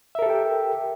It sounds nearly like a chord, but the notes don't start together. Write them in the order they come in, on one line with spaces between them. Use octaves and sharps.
E5 A#4 A4 G4 G5